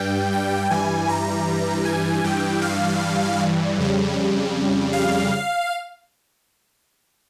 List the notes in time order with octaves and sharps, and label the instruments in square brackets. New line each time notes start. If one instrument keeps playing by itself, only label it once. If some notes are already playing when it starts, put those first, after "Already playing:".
Already playing: [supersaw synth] G2 G3 G5
G5
G2 E3 G3 G#5
A#5
G#5
G2 E3 G3 G5
F5
F2 C#3 G3
F5